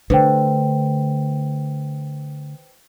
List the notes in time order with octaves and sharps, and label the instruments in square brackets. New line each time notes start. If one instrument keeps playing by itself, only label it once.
[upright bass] D3 A3 [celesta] B4 C5 G5